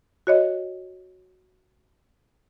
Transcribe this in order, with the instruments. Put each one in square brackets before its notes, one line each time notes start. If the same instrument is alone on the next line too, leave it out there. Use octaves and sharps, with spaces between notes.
[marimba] F#4 C#5 D#5